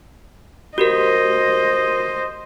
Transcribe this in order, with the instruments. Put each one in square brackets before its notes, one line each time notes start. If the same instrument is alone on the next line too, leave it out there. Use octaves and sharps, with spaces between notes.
[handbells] F#4 G4 A#4 [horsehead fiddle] C5 D#5